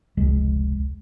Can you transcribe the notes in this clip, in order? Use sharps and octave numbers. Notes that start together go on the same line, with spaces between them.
F1 C#2 G#3